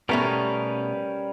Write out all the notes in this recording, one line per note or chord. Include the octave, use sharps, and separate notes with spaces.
B2 G3 A3 B3 C#4 A#4